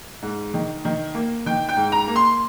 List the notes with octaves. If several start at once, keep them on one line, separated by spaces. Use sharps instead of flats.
G#2
D#3
D#3
A#3
D#3 G5
G5
G#2
A#5
A#3
C6